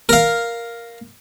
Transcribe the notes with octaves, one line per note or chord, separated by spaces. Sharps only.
A#4 F5